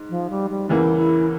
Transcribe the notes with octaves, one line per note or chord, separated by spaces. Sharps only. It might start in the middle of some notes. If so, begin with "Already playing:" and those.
Already playing: G#2
F3
G3
G3
E2 C#3 E3 A#3 E4
E4